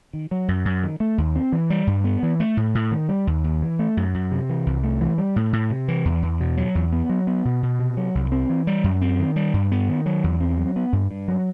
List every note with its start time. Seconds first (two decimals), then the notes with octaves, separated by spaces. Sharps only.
0.13 D#3
0.31 F#3
0.48 F#2
0.65 F#2
0.83 D#3
1.00 A3
1.18 D#2
1.36 C4
1.52 E3
1.70 G3
1.87 G2
2.04 B3
2.23 E3
2.40 A3
2.57 A2
2.75 A2
2.92 D#3
3.09 G3
3.27 D#2
3.44 D#2
3.62 E3
3.79 A3
3.97 F#2
4.14 F#2
4.32 C3
4.49 E3
4.66 C2
4.83 A3
5.01 E3
5.18 G3
5.36 A2
5.53 A2
5.70 C3
5.88 E3
6.05 E2
6.23 E2
6.40 B2
6.57 F#3
6.75 E2
6.92 B3
7.09 F#3
7.27 B3
7.45 B2
7.63 B2
7.79 C3
7.97 F#3
8.15 C2
8.32 C4
8.49 E3
8.67 G3
8.84 F#2
9.01 C4
9.20 D#3
9.36 G3
9.54 G2
9.72 B3
9.89 D#3
10.06 F#3
10.24 E2
10.41 C4
10.58 F#3
10.76 B3
10.93 G2
11.11 G2
11.28 F#3